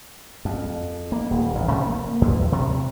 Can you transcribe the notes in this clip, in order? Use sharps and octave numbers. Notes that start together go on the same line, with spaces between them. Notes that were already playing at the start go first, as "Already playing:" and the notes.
F2
A#3
D#1
A1
C3
A#3
E2
C3